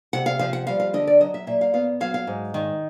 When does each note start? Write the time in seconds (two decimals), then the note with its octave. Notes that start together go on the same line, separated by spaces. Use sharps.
0.13 C3 F#5
0.26 F5
0.39 F3 F5
0.53 F#5
0.67 G3 F5
0.80 F5
0.93 D3 D#5
1.07 D5
1.20 F#3 D#5
1.34 E5
1.47 A#2 E5
1.61 F5
1.74 B3 F5
2.01 F#3 F5
2.14 F5
2.27 G#2
2.54 D#3